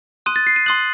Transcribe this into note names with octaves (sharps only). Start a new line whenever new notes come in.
C6 D#6 F#6 D#7
A6
C7
D#7
C6 D#6 F#6 F#7